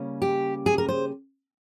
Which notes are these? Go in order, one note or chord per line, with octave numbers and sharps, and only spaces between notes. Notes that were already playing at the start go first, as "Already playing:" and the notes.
Already playing: C#3 G3 A#3 C#4
G4
G#4
A#4
C5